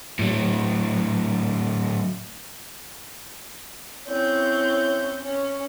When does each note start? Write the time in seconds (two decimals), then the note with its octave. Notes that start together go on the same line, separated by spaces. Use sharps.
0.19 A2 F#3
4.08 C4 C#4 E4 C#5 G6
5.21 C#4